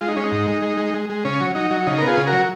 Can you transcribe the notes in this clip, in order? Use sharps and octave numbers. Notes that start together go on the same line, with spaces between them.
G#3 F4
D#4
G#3 C#4
D#4
G#2
G#3
G#3
G#3
G#3
G#3
C#3 C#4
F#3
F#3 D#4
F#3
C#3 D#4
B3 A#4
F4 G#4
C#3
F#4 A#4
F#3